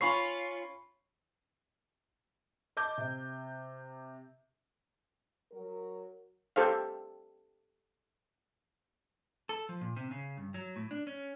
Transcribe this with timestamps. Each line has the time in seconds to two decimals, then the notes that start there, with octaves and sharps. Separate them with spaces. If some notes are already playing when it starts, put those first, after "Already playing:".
0.01 C#4 F4 B5 C#6 C7
2.77 D#5 A5 D6 G6
2.98 C3
5.52 F#3 F#4 A#4
6.56 G4 A4 C5 F5
9.49 A4
9.69 F3
9.81 A#2
9.96 C3
10.11 C#3
10.37 G2
10.54 F#3
10.76 A2
10.91 D4
11.07 C#4